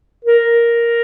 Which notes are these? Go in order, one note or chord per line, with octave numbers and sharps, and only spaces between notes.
A#4